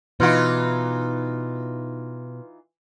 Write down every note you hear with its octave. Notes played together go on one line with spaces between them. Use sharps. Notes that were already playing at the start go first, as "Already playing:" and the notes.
B2 E3 D#4 F4 B4 C6 F6